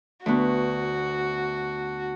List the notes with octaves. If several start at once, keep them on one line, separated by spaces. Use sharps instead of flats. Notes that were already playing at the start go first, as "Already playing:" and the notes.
D2 B3 F#4